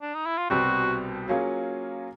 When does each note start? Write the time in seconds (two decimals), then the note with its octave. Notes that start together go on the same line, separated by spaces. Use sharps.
0.02 D4
0.15 D#4
0.26 E4
0.38 F4
0.50 C2 B2 G3 C4 F#4
1.28 F#3 A#3 C#4 F4 G#4